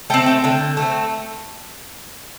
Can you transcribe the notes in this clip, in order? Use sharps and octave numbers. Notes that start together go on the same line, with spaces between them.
A3 C4 G5
G5
D3 G5
A3
C4